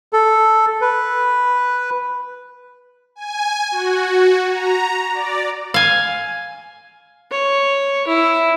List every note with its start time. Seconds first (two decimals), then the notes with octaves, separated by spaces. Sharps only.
0.13 A4
0.81 B4
3.16 G#5
3.71 F#4
4.49 A#5
5.14 D5
5.74 F5 G#5
7.31 C#5
8.08 E4